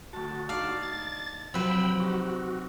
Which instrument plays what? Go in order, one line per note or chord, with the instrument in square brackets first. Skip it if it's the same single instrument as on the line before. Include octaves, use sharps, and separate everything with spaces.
[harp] D2 A5 [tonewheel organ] F#4
[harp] D4 D#4 A5 [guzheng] D5 F5
[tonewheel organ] A6
[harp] C3 F#3 [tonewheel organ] F3 G5 B5 [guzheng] C4 B4
[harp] D#4 G4 [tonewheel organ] F#4